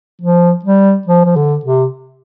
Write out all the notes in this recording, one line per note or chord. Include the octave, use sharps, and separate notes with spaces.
F3
G3
F3
F3
D3
C3